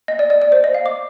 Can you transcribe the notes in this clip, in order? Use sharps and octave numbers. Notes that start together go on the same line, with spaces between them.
D#5
D5
D5
D5
C5
D#5
F5
D6